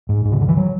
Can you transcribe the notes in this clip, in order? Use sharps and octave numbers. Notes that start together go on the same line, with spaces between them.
G#2
G#2
C#3
D3
E3
F#3